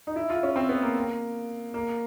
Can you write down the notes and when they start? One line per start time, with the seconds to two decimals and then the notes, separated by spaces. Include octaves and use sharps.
0.07 D#4
0.16 E4
0.30 F4
0.43 C#4
0.56 C4
0.69 B3
0.82 A#3
1.74 A#3